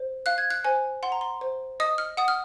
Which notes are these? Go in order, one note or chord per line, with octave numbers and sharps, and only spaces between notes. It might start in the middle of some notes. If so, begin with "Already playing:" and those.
Already playing: C5
F5 F#6
G#6
F#6
C5 G#5
F#5 C6
A#5
C6
C5
D#5 D#6
F6
F#5 D#6
F6